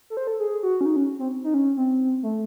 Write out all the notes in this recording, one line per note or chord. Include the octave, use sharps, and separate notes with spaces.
A4
C5
A4
G#4
F#4
C#4
D#4
C#4
C4
D#4
C#4
C4
A3